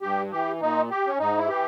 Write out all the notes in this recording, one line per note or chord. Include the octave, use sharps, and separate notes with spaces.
G2 G4
E3 G4
A#2 D#4
G4
C#4
G#2 D#4
E4
E3 G4